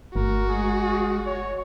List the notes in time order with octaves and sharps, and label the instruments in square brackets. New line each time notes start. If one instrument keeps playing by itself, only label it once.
[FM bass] G1 [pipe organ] A3 [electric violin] F#4 [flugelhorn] A#4
[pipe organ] G#3 [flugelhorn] G#4
[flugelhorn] C#5